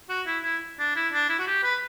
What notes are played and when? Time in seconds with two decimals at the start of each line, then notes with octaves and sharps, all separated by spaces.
0.09 F#4
0.26 E4
0.44 E4
0.79 D4
0.96 E4
1.13 D4
1.29 E4
1.39 F#4
1.47 G4
1.63 B4